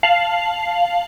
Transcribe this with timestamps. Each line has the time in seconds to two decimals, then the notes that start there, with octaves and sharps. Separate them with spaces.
0.03 F5 A5 C7 F7 F#7